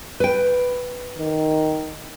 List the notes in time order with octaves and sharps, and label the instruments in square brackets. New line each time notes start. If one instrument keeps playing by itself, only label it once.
[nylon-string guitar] B4 G5
[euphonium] D#3